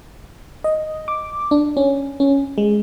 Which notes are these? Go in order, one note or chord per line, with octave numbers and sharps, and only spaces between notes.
D#5
D6
D4
C#4
C#4
G#3